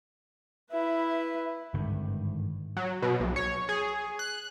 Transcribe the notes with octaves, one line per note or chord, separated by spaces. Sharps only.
E4 B4 E5
G#1 G2 D3 D#3
F#3
B2
B1
C#5
G#4
F#6